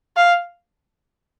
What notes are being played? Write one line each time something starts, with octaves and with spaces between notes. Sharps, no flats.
F5